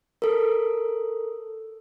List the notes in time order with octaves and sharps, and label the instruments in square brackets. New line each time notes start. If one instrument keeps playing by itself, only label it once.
[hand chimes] A4 A#4